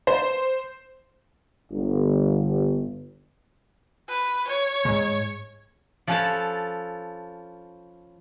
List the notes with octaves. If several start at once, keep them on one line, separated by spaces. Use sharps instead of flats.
C5
G1
B4
C#5
D2 G#2
F3 C#4 A4 B4 C#5 A5